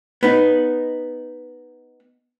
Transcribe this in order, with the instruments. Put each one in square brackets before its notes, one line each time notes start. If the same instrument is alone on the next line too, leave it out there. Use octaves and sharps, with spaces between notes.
[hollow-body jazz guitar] B3 D#4